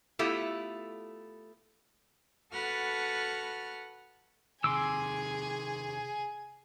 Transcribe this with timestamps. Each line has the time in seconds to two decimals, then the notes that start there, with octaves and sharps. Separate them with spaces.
0.19 A3 B3 E4 F4 G4 A4
2.52 F#4 A4 B4 F#5 A5 F6
4.64 C3 D#3 G#4 G#5 C6 D6 E6